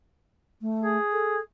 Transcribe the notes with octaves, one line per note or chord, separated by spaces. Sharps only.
A3
G#4
A4